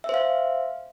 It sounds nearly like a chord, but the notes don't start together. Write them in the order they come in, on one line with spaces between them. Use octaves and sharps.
E5 C5 F5